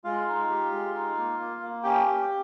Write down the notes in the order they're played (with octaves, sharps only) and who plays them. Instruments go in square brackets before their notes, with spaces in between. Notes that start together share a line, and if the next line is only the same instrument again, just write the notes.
[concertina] G#3 F4 F5
D#4
G4
G#3
D#4
A#3
A#3
A#3
C#4 G4 G5
G4